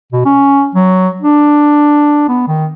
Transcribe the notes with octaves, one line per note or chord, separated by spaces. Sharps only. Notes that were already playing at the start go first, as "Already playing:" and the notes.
B2
C#4
F#3
D4
B3
D#3